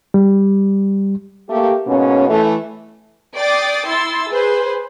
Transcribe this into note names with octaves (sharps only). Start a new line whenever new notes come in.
G3
A3 A#3 G4
G#2 B2 A#3 C#4
E3 A3
D5 G5 D6 D#6 A6 C7
E4 C6 E6 A6
G#4 B4 C5